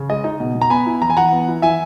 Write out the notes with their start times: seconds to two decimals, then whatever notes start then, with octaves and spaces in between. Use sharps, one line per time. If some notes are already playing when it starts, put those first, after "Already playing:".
Already playing: C#3
0.09 G#3 D#5
0.24 D#4
0.40 B2
0.55 B2
0.62 A#5
0.70 B3 G#5 B5
0.86 E4
1.02 E3 A#5
1.10 G#5
1.17 E3 F#5 A#5
1.32 B3
1.48 E4
1.62 E3 E5 G#5